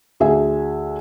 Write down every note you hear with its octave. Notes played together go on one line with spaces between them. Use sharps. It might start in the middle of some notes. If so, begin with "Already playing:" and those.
D2 G#4 E5 G#5